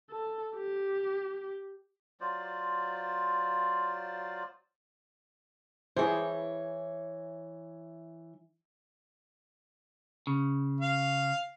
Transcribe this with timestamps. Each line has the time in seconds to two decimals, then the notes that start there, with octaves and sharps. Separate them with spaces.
0.10 A4
0.56 G4
2.21 F#3 F4 C5 D5
5.97 E3 E4 G#4 C5 C#5
10.27 C#3
10.81 F5